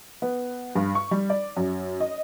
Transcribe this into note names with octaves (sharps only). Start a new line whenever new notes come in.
B3
G2
C#6
G3
D5
F#2
D#5